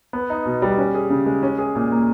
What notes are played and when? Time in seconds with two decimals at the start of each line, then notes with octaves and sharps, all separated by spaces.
0.13 B3
0.30 D#4
0.46 B2
0.62 G3
0.78 C#4
0.94 G#4
1.10 C#3
1.26 G#3
1.43 C#4
1.59 G#4
1.75 A#2
1.92 A#3